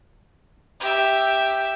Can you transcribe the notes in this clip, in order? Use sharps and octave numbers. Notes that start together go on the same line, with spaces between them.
G4 E5